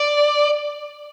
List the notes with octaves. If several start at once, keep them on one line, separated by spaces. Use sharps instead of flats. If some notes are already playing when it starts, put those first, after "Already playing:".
Already playing: D5